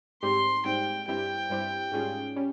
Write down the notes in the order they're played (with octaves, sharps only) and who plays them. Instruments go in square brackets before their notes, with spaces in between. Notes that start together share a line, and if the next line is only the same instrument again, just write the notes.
[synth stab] G#2 G3 C4 G4 [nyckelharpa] C6
[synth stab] G#2 G3 C4 G4 [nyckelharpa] G5
[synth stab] G2 G3 C4 E4 G4 [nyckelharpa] G5
[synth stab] G2 G3 C4 E4 G4
G#2 G3 C#4 F4 G#4
G3 C#4